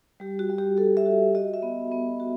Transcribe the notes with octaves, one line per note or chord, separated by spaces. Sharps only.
G3 G4
F#4
G3
G4
F#4 A4
E5
F#4
F#4 D#5
E5
B3
B3
F#4